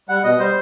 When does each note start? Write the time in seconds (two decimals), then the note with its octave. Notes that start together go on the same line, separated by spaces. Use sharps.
0.09 G3 F#5
0.24 B2 D#5
0.39 G3 C5